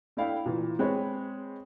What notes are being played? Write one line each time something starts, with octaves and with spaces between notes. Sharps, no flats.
A3 D4 E4 F5 G5
A#2 E3
G#3 C4 G#4 B4 C#5